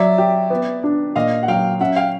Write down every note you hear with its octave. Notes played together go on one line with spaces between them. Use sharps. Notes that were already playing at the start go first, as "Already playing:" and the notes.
Already playing: F#3 D5 E5
G4
B3
D4
A#2 D#5 F5
F#5
F#3 F5 G5
C#4 E5 F#5
F5 G5